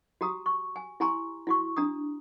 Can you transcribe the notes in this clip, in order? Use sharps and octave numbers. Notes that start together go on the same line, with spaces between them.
F#4 G4 A#5 D#6
C#6
G#5
E4 G4 G#5 A#5 C6 C#6
E4 F#4 C#6
D4 A#5 D#6